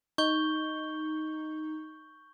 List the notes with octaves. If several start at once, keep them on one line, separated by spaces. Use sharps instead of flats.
D#4 C#6 G6 G7